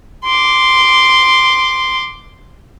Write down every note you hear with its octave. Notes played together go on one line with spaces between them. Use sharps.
C6 D6